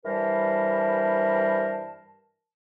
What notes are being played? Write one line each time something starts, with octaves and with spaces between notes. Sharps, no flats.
G2 E3 G3 A#4 C5 A5